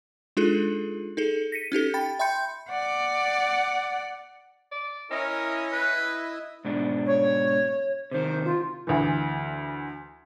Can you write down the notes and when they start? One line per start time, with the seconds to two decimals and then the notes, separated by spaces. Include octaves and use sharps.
0.37 G#3 D4 D#4 F4 G#4 A4
1.17 D#4 G#4 A4
1.52 A#6 B6 C#7 D#7
1.72 C#4 D#4 G4 A4
1.94 G5 B5 A6
2.19 E5 G5 B5 C6 G6 C#7
2.70 D5 F#5
4.71 D5
5.11 C#4 E4 A#4 D#5
5.72 B4
6.65 G#2 B2 D4
7.06 C#5
8.11 C3 D#3 C5
8.45 F4
8.87 D2 E3